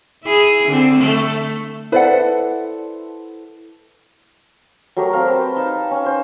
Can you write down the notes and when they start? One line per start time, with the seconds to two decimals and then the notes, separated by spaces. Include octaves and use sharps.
0.24 E4 G#4
0.68 D3 C4
0.98 A3
1.92 E4 A4 B4 C5 D5 F#5
4.97 F#3 A3 G4 A#4
5.13 C4 A#4 F5
5.28 B4 C5 A5
5.56 D#4 A5
5.91 C#4
6.06 C5